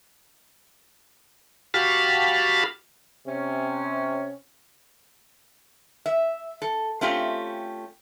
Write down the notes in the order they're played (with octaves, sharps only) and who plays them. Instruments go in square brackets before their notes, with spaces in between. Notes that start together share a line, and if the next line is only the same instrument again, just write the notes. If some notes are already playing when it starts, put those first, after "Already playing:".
[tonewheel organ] F#4 G4 F5 A5 B5 F6
[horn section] C3 C#4
[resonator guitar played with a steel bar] E5
A4
A3 C4 C#4 F4 G4